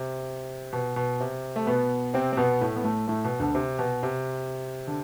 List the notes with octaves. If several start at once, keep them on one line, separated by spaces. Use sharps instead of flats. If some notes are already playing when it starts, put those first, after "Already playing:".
Already playing: C3
B2
B2
C3
A3
B2 B3
C3 C4
C4
B2 B3
A2 A3
B3
A2 A3
A2 A3
B2
D2 D3
C3
B2
C3
D3